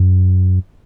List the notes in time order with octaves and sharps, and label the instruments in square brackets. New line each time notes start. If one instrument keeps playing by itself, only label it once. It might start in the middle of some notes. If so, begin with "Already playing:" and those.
Already playing: [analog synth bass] F#2